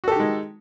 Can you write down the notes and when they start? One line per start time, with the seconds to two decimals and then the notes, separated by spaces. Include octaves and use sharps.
0.04 F#4
0.08 A4
0.12 G4
0.16 D#3
0.20 G#3